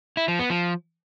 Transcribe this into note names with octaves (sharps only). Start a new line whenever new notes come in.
E4
F3
B3
F3